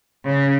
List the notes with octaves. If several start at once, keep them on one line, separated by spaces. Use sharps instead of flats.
C#3